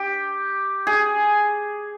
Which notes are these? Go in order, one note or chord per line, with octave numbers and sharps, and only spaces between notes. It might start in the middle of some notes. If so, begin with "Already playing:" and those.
Already playing: G4
G#4